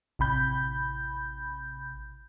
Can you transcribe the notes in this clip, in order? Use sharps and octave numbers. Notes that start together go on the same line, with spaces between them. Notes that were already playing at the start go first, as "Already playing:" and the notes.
A1 C3 B5 G6